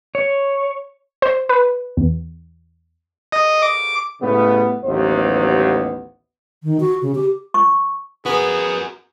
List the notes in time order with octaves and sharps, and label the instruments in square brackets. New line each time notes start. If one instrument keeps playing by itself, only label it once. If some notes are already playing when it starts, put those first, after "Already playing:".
[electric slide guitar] C#5
[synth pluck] C5
B4
E2
[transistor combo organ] D#5
D6
[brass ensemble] A2 C#3 G3 B3
A1 D#2 F#3 B3 C5
[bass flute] D#3
F#4
C#3
G4
[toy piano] C#6
[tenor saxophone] B3 [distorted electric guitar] F#4 A#4 [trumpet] G#4